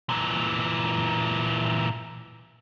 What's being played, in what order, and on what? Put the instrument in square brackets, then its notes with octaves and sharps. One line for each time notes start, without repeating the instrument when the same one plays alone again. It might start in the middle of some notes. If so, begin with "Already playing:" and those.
[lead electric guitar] A#2 E3